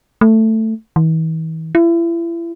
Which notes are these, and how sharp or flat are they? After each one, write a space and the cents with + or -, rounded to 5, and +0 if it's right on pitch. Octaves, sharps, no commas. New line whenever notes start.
A3 +10
E3 -45
E4 +35